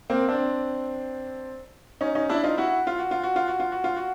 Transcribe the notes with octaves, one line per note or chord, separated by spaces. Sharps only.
A#3 C4
C4 D4
C#4 D#4
C#4 D#4
D4 E4
D#4 F4
E4 F#4
F4
F#4
F4
F#4
F4
F#4
F4
F#4
F4
F#4